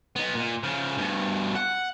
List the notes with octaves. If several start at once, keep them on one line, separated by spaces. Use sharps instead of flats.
B3 D#4
A#2
C#3 F3
G2 B2
F#5